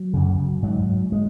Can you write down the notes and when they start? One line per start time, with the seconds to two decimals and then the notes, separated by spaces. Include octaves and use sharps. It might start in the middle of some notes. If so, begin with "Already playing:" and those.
Already playing: F#3
0.14 F#2 C#3
0.63 G#2 F#3
1.12 G#3